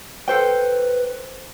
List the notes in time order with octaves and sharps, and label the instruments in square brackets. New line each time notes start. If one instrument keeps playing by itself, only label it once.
[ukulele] A4 C5 G5 [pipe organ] B4